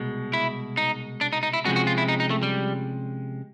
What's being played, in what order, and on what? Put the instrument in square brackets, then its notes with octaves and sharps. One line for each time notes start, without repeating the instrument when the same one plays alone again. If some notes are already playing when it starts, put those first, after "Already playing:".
Already playing: [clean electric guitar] C2 B2 G#3
[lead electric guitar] E4
D#4
D4
D#4
D#4
E4
[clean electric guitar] C3 F3 G#3 C#4 [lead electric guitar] F#4
[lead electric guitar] F#4
F4
E4
D#4
D#4
A3
G3